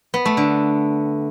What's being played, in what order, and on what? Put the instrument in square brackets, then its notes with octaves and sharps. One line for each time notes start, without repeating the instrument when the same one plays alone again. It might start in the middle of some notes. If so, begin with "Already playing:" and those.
[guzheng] B3
A3
D3